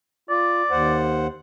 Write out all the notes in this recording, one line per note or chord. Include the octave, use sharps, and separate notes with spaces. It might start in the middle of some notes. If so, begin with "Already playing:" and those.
F4 D5
D#2 C5 F#5